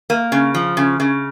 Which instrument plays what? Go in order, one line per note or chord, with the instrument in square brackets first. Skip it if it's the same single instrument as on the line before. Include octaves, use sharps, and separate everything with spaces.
[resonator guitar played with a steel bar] A#3
C#3
F3
C#3
C#3